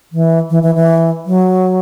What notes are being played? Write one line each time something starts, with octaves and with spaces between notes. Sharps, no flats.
E3
E3
E3
E3
F#3